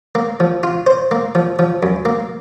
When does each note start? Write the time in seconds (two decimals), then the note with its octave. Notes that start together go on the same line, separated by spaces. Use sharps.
0.15 A#3
0.40 F3
0.63 F4
0.86 C5
1.11 A#3
1.35 F3
1.59 F3
1.83 F#2
2.05 A#3